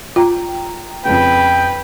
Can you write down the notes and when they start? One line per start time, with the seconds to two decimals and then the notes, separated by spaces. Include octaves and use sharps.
0.16 F4 G5 A#5
1.05 F2 C#3 B4 G5